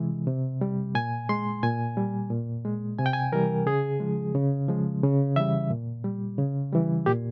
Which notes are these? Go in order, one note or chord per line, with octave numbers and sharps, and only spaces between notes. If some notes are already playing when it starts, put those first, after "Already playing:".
Already playing: C3 E3 G#3
C3
G3
A#2 G#5
G#3 C6
A#2 G#5
G3
A#2
G#3
C3 G#5
G5
G#5
E3 G3 A#4
C#3 G#4
F3 G#3
C#3
F3 G#3
C#3
E3 G3 E5
A#2
G3
C#3
E3 G3
A#2 G4